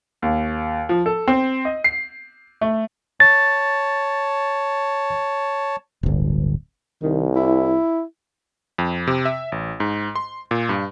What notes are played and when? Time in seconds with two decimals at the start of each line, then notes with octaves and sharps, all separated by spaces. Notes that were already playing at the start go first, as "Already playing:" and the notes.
0.22 D#2
0.89 F3
1.06 A4
1.28 C4
1.65 D#5
1.84 C7
2.61 A3
3.20 C#5 A5 A6
6.03 D1 G1
7.02 C2 D#3
7.36 E4
8.78 F2
9.07 C3
9.25 E5
9.52 A1
9.80 G#2
10.16 C6
10.51 A#2
10.69 G2